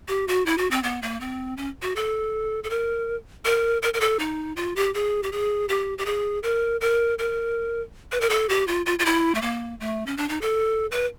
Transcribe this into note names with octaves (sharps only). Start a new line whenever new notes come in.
G4
F#4
E4
F#4
C4
B3
A#3
C4
C#4
F#4
A4
A4
A#4
A#4
A#4
A#4
A4
D#4
F4
G4
G#4
G4
G#4
G4
G4
G#4
A#4
A#4
A#4
B4
A#4
A4
G4
F4
F4
F4
E4
A3
A#3
A3
C#4
D4
D#4
A4
B4